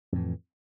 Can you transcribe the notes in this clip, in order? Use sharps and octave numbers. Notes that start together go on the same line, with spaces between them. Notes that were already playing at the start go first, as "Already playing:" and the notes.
F2 A2 E3